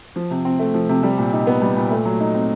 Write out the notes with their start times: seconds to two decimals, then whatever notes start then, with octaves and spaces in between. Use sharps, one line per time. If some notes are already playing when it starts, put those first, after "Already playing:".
0.16 F3
0.31 C3
0.45 C4
0.59 A3
0.74 F3
0.89 C3
1.03 G3
1.18 A#2
1.33 D#4
1.47 B3
1.62 G3
1.77 A#2
1.91 A3
2.05 F#3
2.20 D#4
2.34 C4